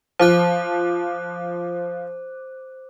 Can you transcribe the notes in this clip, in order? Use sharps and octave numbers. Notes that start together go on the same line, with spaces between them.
F3 C5 D6 F#6